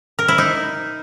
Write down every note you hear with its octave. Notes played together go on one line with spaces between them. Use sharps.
A#4
E4
D#4